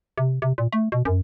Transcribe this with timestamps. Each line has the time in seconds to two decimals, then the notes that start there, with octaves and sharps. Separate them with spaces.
0.18 C3
0.42 C3
0.58 A#2
0.73 A3
0.92 B2
1.05 F#2